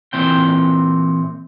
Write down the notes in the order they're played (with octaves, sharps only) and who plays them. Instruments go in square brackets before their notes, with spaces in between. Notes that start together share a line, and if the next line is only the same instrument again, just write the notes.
[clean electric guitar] A#2 E3 C4 G5